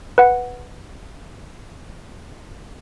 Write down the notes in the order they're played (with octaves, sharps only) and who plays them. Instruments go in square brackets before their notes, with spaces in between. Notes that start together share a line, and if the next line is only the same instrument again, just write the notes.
[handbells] B4 F#5